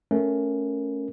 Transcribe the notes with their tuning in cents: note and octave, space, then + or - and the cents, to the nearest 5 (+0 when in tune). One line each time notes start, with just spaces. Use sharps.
A3 +0 C#4 +0 A#4 +0